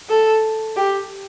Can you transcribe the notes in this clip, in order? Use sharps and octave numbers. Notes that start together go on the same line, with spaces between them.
A4
G4